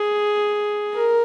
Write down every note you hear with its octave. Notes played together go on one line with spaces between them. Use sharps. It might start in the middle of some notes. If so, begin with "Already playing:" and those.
Already playing: G#4
A#4